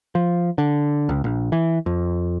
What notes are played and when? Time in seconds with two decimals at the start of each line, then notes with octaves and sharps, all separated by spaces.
0.15 F3
0.58 D3
1.09 C#2
1.24 A#1
1.52 E3
1.86 F2